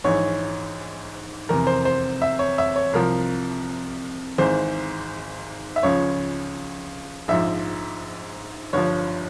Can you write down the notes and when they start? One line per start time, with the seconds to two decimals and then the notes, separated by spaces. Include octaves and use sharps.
0.04 A#1 G#2 E3 C#5
1.49 F1 E2 C3 A#4
1.67 C5
1.85 C5
2.22 E5
2.39 C#5
2.58 E5
2.76 C#5
2.93 C2 C3 F3 A#4
4.38 G#1 G#2 E3 C5
5.76 E5
5.83 C#2 C#3 F3 C#5
7.28 A#1 G#2 F3 E5
8.73 G1 G2 F3 C#5